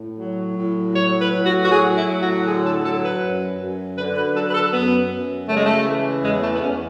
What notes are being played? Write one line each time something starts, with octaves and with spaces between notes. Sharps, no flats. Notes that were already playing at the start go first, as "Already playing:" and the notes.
Already playing: A2
F#3
A2
F#3 C#5
B4
A2
F#4
F#4
F#3 G#4
E4
A2
F#4
D3 G#4
A4
F#3 A4
B4
F#2
F#2
D3 B4
B4
F#3 A4
B4
A4
F#2 B3
F#2
C#3 A3
G#3
A3
E3
E2 G#3
A3
B3
E2 C#4